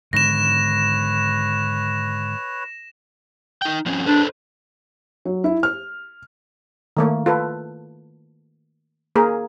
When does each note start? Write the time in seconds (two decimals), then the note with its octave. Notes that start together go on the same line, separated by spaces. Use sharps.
0.13 G#2 D3 D#3 B4 C#5 A#6 E7
3.62 D#4 G5
3.86 F3 C4 C#4
4.06 D4 A4 B4 C5
5.25 F#3
5.44 E4
5.63 F6
6.97 D#3 A3 A#3
7.26 F4 A4 B4
9.16 A#3 G#4 A#4